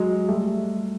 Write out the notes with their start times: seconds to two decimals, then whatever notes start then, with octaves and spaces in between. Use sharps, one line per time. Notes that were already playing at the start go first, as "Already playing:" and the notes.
Already playing: F#3 G#3
0.28 G3 A3